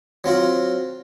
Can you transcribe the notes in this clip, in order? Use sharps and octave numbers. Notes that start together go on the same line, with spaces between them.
F#3 C4 F4 F#4